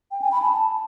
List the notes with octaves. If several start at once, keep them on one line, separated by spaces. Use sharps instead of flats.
G5
G#5
B5
A5